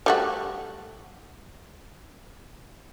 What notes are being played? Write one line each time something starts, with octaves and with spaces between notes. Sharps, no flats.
G3 A3 F#4